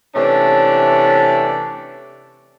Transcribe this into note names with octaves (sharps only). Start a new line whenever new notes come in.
C3 E3 A3 C#4 D4